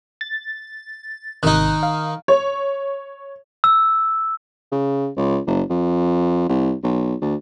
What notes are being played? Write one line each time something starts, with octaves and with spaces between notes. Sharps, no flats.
A6
G#1 C3 D#3 D#4 F#6
F5
C#5
E6
C#3
C#2
F#1
F2
C2
B1
D2